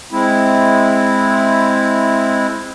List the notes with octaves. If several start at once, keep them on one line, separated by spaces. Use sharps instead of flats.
G#3 C4 E4